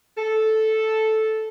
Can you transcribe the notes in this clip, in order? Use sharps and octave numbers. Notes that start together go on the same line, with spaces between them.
A4